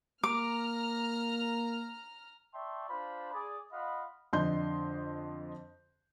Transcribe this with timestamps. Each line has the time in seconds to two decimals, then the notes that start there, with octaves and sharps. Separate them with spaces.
0.23 A#3 A#5 D6 F6
2.54 D5 E5 G5 A5 C6 C#6
2.89 D4 F4 C5 B5
3.33 G#4 D5
3.72 F4 D#5 F5 F#5 B5
4.33 F2 D3 D#5 C6 G6